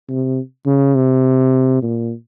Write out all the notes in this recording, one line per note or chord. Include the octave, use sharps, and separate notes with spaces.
C3
C#3
C3
A#2